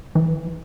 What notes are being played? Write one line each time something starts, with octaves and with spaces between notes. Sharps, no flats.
E3